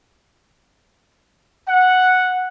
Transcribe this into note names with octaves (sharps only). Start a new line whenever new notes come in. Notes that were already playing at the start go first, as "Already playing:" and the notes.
F#5